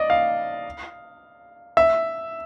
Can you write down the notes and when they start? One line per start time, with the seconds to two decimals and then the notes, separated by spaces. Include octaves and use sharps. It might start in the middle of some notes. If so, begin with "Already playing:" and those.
Already playing: D5 D#5
0.10 F5
1.77 E5